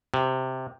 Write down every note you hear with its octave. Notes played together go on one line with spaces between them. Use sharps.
C3